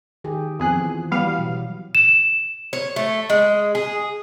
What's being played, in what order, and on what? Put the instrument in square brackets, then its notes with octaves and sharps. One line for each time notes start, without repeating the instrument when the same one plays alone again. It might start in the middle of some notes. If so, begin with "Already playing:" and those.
[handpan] D#3 G4 G#4
[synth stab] F2 G#4 F#6 [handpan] B3
[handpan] E3 F3
[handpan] E3 F#3 [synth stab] G3 B3 F5
[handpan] B2
[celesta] E7
[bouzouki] C#5
A3
G#3
G#4